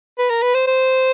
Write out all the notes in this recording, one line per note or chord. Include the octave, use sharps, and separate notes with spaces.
B4
A#4
B4
C5
C5